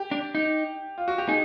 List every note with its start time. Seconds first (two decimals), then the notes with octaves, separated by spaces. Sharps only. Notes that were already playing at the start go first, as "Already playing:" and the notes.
Already playing: G4
0.11 D4
0.35 D#4
0.98 F4
1.08 F#4
1.18 G4
1.28 D#4 G#4